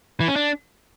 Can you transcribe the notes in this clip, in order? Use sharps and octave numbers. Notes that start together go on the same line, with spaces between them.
E3
C#4
D4